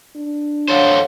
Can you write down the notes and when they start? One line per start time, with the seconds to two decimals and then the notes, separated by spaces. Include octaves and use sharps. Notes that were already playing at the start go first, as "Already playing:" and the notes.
0.16 D4
0.68 F#3 A4 C5 C#5 F5 F#5